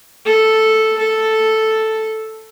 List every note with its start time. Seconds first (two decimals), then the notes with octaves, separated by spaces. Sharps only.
0.25 A4
0.98 A4